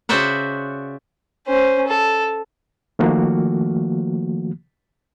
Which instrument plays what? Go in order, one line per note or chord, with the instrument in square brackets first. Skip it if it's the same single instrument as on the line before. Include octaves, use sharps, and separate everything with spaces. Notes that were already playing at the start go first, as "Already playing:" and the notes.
[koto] C#3 F#4 C5 D5 E5 F#5
[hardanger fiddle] C#4 C5
A4
[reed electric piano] D#3 F3 A3 A#3 F#4